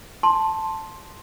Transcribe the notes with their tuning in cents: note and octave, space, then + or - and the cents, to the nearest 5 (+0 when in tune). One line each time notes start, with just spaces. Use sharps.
A5 +0 C6 +10